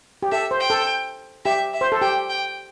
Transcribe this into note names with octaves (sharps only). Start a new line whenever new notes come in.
G4
A4 E5
C5
G5
A4
G4 E5
E5
C5
A4
G4 G5
G5